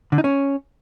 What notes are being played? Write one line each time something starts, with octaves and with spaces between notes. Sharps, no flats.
D3
D#4
C#4